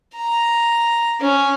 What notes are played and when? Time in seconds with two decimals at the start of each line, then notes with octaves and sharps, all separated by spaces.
0.16 A#5
1.21 C#4